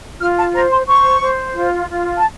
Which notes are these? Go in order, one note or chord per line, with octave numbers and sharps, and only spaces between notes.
F4 F6
A5
C5 A#5
C6
C5 C#6
C5
F4
F4
A5